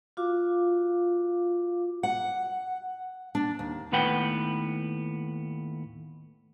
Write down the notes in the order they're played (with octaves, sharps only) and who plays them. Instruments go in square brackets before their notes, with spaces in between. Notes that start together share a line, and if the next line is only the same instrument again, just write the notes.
[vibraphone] F4 F#4 F5 D6
[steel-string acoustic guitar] F#5
D4
D#2
[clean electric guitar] D#2 A2 B3 B4 F#5 G5